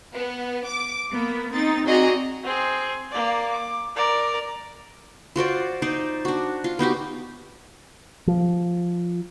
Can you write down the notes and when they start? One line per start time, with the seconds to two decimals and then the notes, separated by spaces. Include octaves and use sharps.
0.14 B3
0.66 D6
1.11 A#3 B3
1.54 C4 D#4 A6
1.85 C4 F#4 G#4 D5 D#5 A#5
2.44 C4 G#4
3.11 A#3 D5
3.52 D6
3.96 A#4 D5
5.36 F4 F#4 C5 D5
5.82 D#4 C5 D5
6.25 D4 F#4
6.64 F4
6.79 B3 D#4 F#4 G4
8.27 F3